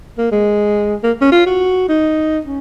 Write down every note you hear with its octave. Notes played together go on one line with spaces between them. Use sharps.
A#3
G#3
A#3
C#4
F4
F#4
D#4
C#4